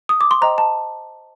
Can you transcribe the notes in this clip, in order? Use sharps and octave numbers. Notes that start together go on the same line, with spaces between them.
D#6
D6
C6
C5 D#5 G5 A#5
A5